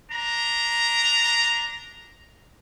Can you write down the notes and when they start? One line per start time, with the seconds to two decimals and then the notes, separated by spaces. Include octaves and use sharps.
0.11 D4 A#5